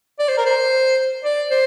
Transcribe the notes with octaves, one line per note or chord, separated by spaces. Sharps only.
D5
C5
A#4
C5
D5
C5